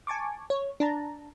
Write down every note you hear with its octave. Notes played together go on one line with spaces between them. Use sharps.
G#5 A5 C#6 D6
C#5
D4 A5 A#5